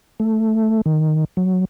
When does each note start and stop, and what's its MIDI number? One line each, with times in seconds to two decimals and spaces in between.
0.20 0.81 57
0.86 1.25 51
1.37 1.65 54